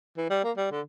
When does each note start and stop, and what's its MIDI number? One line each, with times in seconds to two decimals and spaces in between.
0.17 0.26 52
0.30 0.40 55
0.44 0.52 58
0.57 0.67 55
0.72 0.81 50